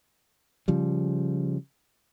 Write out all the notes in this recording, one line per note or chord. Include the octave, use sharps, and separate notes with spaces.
C#3 F3 G3